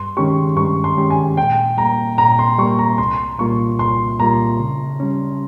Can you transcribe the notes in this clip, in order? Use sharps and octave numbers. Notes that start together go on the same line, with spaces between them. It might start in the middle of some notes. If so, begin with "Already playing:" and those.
Already playing: G2 C6
D#3 G#3 C#4 G4 C#6
G2 C#6
C6
D#3 G#3 C#4 G4
G#5
A#2 G5
G3 A#3 A#5
A#2 A#5
C6
G3 A#3 C#6
A#5
C2 C6
A#2 G3 A#3 F4 C#6
C2 C6
A#2 G3 A#3 F4 A#5
C#3
G3 C#4